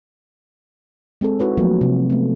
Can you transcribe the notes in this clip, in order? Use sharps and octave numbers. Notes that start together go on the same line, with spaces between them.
G#3 C4 G#4 A4
D#4 E4 F#4 B4 C#5
F3 F#3 A3 A#3 F4
C3
A3 B3